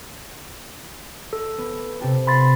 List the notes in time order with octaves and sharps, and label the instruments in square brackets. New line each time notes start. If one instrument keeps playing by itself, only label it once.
[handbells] A4
[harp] B3
C3 G4 A4
[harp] F5 [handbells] B5 C6 A6